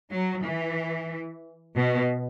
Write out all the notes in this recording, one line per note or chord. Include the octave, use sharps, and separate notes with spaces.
F#3
E3
B2